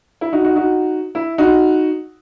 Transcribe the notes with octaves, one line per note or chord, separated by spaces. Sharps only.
E4
D#4 F#4
D#4 F#4
D#4 F#4
E4
D#4 F#4